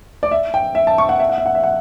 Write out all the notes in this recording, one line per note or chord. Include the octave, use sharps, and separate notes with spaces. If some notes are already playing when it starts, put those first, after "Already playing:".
D5
E5
G5
E5
A5
C#6
F#5
E5
F#5
E5
F#5
E5
F#5